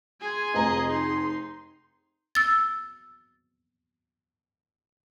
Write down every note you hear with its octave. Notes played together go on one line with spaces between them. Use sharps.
G#4 G#5 C6
F1 D#5 A#5
D#4 C6
E6 A6